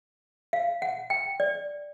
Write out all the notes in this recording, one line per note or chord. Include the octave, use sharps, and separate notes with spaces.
F5
F#5
G5
D5